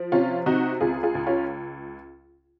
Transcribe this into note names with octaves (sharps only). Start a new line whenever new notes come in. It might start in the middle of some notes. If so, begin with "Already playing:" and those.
Already playing: F3
C3 C#4 F4
C3 D#4 F#4
C#2 F4 G#4
F4 G#4
C#2
C#4 F4